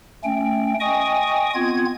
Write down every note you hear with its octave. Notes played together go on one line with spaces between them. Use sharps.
A3 C#4 G5
D#5 G5 G#5 C#6 D#6
B3 C4 F4 G#6